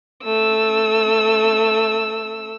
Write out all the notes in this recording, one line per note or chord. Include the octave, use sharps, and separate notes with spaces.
A3 E6